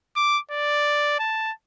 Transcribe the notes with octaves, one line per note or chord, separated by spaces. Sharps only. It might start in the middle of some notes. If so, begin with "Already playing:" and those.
D6
D5
A5